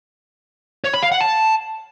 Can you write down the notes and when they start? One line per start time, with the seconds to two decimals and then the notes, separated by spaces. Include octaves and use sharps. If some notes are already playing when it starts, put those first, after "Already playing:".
0.84 C#5
0.94 B5
1.03 F5
1.12 F#5
1.21 A5